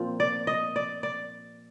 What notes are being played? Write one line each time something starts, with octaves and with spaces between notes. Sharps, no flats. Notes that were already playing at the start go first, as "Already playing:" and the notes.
Already playing: A#2 F3 C4
D5
D#5
D5
D5